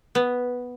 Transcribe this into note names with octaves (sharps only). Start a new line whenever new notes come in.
B3